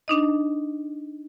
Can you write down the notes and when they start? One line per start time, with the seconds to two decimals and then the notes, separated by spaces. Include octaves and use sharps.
0.08 D4 D#4 D#5